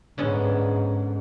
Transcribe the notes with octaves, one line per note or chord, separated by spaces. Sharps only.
G#2 D3 B3 C#4